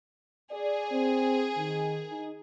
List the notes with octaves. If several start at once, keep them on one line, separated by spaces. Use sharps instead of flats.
G#4 D5
C4
D#3
D#4